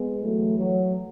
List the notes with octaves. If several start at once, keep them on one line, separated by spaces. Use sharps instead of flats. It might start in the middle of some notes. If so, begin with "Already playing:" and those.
Already playing: G#3 B3
A2 E3 F#3 A3
F#3